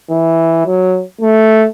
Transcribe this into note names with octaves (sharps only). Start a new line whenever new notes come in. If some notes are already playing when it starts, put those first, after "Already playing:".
E3
F#3
A3